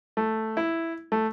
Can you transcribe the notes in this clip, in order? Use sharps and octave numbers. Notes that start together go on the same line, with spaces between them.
A3
E4
A3